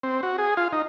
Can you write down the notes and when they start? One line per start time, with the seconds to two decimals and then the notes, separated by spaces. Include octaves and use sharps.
0.03 C4
0.23 F#4
0.38 G#4
0.57 F4
0.73 D#4